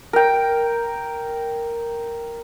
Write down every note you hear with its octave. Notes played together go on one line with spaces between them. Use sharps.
A#4 G5